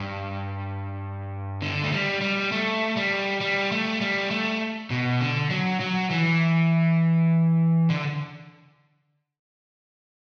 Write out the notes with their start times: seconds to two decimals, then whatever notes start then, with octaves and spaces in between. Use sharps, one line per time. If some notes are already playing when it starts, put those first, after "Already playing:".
Already playing: G2
1.62 D3
1.83 A3
1.92 G3
2.21 G3
2.52 A3
2.97 G3
3.41 G3
3.72 A3
4.01 G3
4.31 A3
4.90 B2
5.21 D3
5.51 F#3
5.80 F#3
6.10 E3
7.90 D3